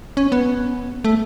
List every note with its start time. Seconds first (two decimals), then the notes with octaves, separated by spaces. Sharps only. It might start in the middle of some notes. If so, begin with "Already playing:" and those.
0.17 C#4
0.32 B3
1.04 A3